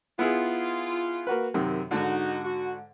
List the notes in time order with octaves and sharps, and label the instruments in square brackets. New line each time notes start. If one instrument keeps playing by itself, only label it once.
[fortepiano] B3 E4 G#4 [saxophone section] F4
[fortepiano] A#3 F#4 B4
F#2 C3 D#3
[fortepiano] G#2 D3 [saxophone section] D#4 F#4
[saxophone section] F#4